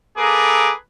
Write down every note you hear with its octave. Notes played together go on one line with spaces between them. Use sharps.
A#3 G#4 A4 B4 A#5 D6